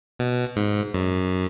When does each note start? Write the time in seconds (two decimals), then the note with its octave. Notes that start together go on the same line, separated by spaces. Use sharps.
0.19 B2
0.56 G#2
0.94 F#2